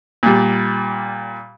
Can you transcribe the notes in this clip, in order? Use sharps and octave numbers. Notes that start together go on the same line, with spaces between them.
A#2 G3